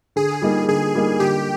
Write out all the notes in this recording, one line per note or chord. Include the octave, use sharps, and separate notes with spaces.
D3 G#4
G3 A#3 D#4
D3 G#4
G3 A#3 D#4
D3 G4